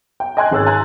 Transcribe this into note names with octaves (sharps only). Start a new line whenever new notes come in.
G5
D#5 G5 G#5 C6 F#6 G#6
G#1 G#4 C#5 E6 F#6 A6
G#5 A#5 C6 F#6 G#6 A6